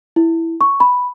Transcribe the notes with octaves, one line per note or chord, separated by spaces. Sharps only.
E4
C#6
B5